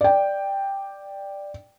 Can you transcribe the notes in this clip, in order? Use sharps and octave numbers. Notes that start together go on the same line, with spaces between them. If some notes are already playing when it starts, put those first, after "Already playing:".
D5 G5